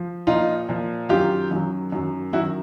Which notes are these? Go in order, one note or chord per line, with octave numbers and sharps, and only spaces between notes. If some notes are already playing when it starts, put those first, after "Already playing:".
Already playing: F3
A#2 F3 D#4 F4
A#2 F3
F#2 D#3 F#3 F4 G4
F#2 D#3 F#3
F#2 D#3 F#3
F#2 D#3 F#3 E4 F#4